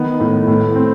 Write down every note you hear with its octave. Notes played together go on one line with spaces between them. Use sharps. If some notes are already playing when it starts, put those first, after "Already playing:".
Already playing: D#3 B3
A2
A2
C4